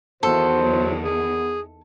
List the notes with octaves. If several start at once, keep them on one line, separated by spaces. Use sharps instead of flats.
E2 D#3 F#4 A4 C5
F#3
B3 G#4